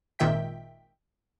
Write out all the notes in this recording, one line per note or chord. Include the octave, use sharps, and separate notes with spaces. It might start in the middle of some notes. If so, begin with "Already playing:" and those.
G#1 A#2 D#3 E5 G5 B6